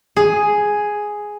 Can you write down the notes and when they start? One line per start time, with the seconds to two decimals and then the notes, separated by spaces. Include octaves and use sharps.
0.16 G#4